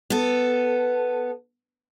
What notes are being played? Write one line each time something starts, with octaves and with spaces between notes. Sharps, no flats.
B3 A4